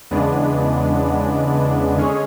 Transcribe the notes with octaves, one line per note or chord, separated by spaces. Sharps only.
E2 C#3 G#3 B3 D4
D3 G#3 C#4 G#4 C#5